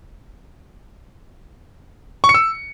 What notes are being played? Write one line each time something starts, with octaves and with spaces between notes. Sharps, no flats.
C#6
C#7
E6